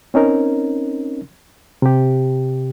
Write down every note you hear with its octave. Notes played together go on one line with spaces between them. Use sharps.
C4 C#4 D#4 A#4
C3 G4